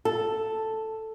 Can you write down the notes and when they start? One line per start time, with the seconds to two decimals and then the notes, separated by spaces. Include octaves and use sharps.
0.05 A4